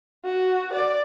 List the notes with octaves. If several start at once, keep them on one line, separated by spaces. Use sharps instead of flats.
F#4
D5